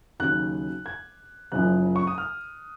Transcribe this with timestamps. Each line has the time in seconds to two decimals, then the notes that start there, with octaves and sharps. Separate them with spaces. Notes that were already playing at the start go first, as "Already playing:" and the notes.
0.19 D#2 C#3 F#3 F#6
0.86 G#6
1.52 F#1 F#2 C#3 F3 F#6
1.96 C#6
2.07 D#6
2.18 F6